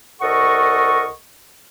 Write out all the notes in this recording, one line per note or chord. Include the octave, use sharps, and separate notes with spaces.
C2 A4 A#4 D#5 F#5 C#6